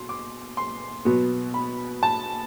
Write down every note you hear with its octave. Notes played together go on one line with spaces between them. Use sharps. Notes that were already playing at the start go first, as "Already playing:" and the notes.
Already playing: B2 C6
D6
C6
B2 F#3 B3
B5
A5